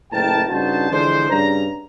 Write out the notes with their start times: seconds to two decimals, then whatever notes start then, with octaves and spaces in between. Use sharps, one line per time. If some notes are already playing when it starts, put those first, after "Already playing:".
0.11 F#1 A2 A#4 G5 A5
0.49 G2 C#3 D#4 F#4 C5 A5
0.91 D3 E3 F3 G#3 D4 C5
1.30 G2 C#3 A#5